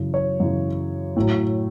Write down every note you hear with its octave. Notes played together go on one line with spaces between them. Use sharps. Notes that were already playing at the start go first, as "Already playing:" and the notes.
Already playing: F#2 C#3 E3
C#5
F#2 C#3 E3
A2 F#3